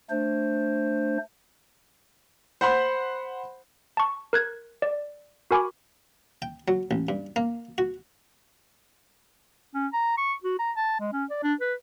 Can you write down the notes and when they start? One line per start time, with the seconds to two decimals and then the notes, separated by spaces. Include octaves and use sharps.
0.10 A3 D4 C5
2.61 C5 F#5 B5 C6
3.97 A5 C#6
4.33 A#4 F#6 G#6
4.82 D5
5.51 F#4 A#4 G#5 B5 C#6 D6
6.42 G5
6.68 F#3
6.91 A1
7.09 G2
7.36 A#3
7.78 F#4
9.75 C#4
9.93 A#5
10.18 C#6
10.44 F#4
10.59 A#5
10.77 A5
11.00 G#3
11.13 C#4
11.30 D5
11.43 D4
11.61 B4